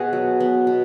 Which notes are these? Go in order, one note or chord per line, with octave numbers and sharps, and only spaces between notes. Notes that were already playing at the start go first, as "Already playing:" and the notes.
Already playing: B2 B3 F#4 G#4
F#3
B3
B2